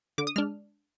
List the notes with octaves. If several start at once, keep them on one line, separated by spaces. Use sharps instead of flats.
D3 D6
D#6
G#3 D4 F6